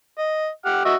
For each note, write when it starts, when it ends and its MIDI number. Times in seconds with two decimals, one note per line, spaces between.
0.18 0.48 75
0.65 0.82 67
0.65 0.82 78
0.65 0.82 89
0.85 0.95 66
0.85 0.95 75
0.85 0.95 76